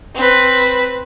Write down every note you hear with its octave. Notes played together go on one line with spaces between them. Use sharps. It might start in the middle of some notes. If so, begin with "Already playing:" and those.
C4 B4